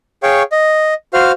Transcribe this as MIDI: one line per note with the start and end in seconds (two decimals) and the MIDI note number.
0.23 0.43 68
0.23 0.43 73
0.23 0.43 77
0.23 0.43 79
0.23 0.43 85
0.52 0.94 75
1.14 1.32 66
1.14 1.32 72
1.14 1.32 77
1.14 1.32 89